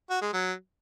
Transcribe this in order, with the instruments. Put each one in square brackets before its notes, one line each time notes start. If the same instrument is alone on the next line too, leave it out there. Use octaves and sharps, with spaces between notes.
[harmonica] F#4
G#3
F#3